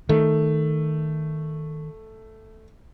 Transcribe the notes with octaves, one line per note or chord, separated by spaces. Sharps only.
D#3 A3